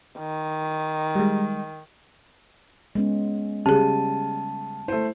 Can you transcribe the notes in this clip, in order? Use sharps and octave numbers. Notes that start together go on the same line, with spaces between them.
D#3
G3 G#3
G#3 B3 C#4
C#3 G3 G4 G#4 A5
A3 E4 C5